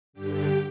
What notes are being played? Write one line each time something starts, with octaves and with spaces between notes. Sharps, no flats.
G2 D3 G4